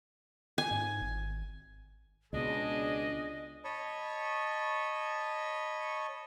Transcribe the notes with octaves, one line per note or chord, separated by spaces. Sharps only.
G#5
G#2
G#1
C#2 B2 D4 G#4 D#5
C#5 D#5 A5 B5 C#6